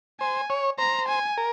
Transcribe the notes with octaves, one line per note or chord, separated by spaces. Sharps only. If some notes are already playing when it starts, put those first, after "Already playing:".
C5 G#5
C#5
C5 A#5
G#5
A#4